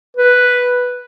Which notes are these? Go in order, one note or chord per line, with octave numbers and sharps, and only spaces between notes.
B4